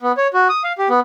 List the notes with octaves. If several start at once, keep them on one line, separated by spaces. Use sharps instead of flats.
B3
C#5
F#4
D#6
F5
G4
B3